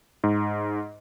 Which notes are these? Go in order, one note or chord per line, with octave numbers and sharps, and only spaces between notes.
G#2